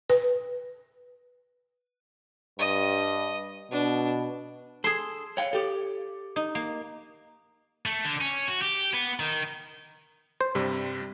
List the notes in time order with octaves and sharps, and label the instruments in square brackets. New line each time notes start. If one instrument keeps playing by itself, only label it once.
[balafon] B4
[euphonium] G2 [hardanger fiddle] D#5
[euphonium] B2 [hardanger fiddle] D4
[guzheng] G#4 C6 [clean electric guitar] A4
[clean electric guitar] C#5 F5 G5
G4 A4
[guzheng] D#4
A#3
[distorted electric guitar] A3
D3
C#4
F#4
G4
B3
D#3
[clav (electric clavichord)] C5
[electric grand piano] G2 C3 G3